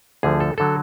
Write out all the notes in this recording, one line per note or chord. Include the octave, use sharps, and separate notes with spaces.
D2 D3 F3 G#4
A4
D3 F#3 A4